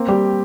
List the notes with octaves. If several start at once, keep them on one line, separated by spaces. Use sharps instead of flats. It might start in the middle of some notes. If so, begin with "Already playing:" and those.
Already playing: A#3 C4
G3 G4